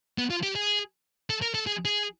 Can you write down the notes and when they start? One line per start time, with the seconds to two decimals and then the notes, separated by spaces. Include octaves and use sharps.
0.18 B3
0.30 F4
0.43 G4
0.56 G#4
1.30 A4
1.42 A#4
1.54 A4
1.67 G#4
1.85 G#4